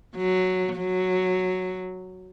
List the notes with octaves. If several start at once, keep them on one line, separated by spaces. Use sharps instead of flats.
F#3
F#3